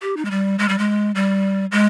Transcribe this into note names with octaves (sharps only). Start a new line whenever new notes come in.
G4
D#4
G#3
G3
G#3
G3
G#3
G3
G#3